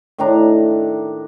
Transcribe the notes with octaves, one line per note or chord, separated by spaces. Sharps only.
A2 D#3 D4 A#5